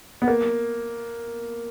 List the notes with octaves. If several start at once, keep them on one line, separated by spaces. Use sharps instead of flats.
B3
A#3